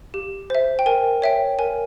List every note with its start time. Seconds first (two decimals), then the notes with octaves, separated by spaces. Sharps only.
0.14 G4
0.50 C5 E5
0.79 G5
0.86 A#4 G#5
1.22 C#5 E5 G5
1.59 A#4 G#5